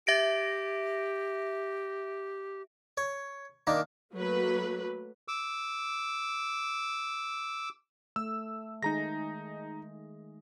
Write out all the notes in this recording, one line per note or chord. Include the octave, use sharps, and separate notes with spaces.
G4 E5 A#6 D7
C#5
D#3 A#3 D4
F#3 A3 A#3 B4
D6 E6
A3 E6
D#3 G#3 D#4 G#4 A#5 A#6